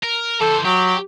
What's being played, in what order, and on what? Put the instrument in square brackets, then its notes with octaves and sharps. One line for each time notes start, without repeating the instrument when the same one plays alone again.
[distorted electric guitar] A#4
[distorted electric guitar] E3 C5 [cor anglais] A4
[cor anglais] F#3 [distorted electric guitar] G4